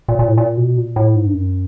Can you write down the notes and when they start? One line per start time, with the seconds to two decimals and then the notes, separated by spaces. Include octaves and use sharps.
0.08 A#2
0.19 A#2
0.28 A2
0.38 A#2
0.57 B2
0.77 A#2
0.96 A2
1.16 G#2
1.26 G2
1.34 F#2